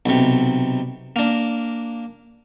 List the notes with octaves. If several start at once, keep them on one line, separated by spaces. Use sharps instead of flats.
B1 C3
A#3 D4